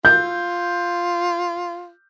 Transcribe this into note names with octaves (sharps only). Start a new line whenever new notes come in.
F4 G6